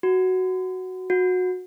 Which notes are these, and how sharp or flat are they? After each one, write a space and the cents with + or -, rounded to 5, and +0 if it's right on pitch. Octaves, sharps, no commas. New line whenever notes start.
F#4 +5
F#4 -20